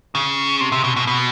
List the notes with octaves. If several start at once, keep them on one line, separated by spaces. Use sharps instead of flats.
C#3
C3
C3
B2
B2
B2